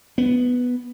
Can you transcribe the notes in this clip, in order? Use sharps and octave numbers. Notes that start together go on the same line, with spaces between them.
B3